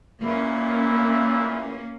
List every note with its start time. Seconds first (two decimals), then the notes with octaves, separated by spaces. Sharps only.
0.24 E2 A#2 A#3 C#4 E4